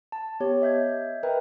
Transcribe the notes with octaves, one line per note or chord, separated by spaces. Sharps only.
A5
B3 G4 C#5
D#5 E5 G6 G#6
A#4 B4 D#5 E5 G5 A#5